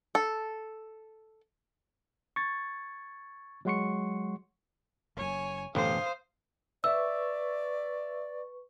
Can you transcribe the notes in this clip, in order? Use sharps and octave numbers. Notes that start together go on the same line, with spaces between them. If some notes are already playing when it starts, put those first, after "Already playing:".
A4
C#6 G#6 A6
F#3 G#3 F#5 C6 C#6 C#7
F#1 F#2 C#5 G#5
A1 F#2 B2 D3 C5 F5 D#6
B4 D5 E5 C#6 E6